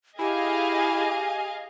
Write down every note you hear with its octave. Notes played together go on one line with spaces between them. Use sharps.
E4 G4 G#4 D#5 F5 G#5